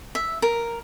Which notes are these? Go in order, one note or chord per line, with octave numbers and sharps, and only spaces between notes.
E5
A#4